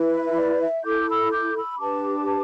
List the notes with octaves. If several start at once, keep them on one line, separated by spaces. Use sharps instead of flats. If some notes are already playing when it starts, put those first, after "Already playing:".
Already playing: E4 B4
E5
E5
D5
E5
E4 A4 D6 G6
B5 E6
D6 G6
B5 E6
D4 G4 B4 A5 D6